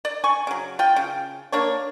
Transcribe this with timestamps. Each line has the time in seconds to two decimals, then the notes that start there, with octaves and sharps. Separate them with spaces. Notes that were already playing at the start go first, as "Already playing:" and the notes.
0.05 D5
0.24 G#5 C#6
0.47 C#3 F#3
0.79 F4 G5
0.96 C#3
1.52 A#3 D4 C#5